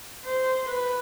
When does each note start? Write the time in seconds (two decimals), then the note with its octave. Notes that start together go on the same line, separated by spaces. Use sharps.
0.24 C5
0.69 B4